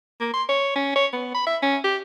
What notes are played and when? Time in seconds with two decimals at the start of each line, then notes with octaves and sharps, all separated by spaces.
0.20 A#3
0.34 C6
0.49 C#5
0.75 C#4
0.95 C#5
1.13 B3
1.35 B5
1.47 E5
1.62 C#4
1.84 G4